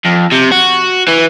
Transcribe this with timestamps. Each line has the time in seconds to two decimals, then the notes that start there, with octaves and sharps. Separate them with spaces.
0.05 F2
0.32 C3
0.51 F#4
1.08 E3